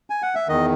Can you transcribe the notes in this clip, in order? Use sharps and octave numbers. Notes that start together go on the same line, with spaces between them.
G#5
F#5
E5
E2 D#3 D#5